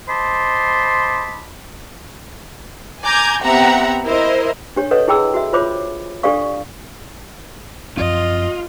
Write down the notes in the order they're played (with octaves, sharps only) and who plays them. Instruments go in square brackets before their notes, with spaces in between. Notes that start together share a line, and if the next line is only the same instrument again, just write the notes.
[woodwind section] C5 D#5 A5 B5 C6 D6
[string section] G#5 A#5 D6 G6 G#6
B3 C4 G4 E5 F#5 A#5
E4 A#4 C5 D#5
[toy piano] D4 G4 C#5
A4 B4 C#5 D#5 F#5
E4 G#4 G5 B5 E6
F#4 E5
F4 C5 C#5 B5 D6
D4 G4 A4 D5 F5 C#6
[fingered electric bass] F#2 F3 C4 [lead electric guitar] F4 [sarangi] D#5